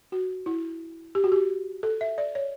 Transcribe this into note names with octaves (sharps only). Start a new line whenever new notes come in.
F#4
E4
G4
F#4
G4
A4
E5
D5
C#5